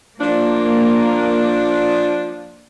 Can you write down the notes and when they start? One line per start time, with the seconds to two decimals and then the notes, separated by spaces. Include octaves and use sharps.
0.20 F3 A#3 D4